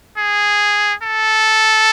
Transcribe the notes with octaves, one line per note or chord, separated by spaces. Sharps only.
G#4
A4